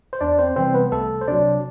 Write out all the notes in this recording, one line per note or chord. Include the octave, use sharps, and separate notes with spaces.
C5
E2 D4 D5
C4 C5
C3 E3 G3 C4 C5
B3 B4
C2 A3 A4
C5
C3 F#3 D4 D5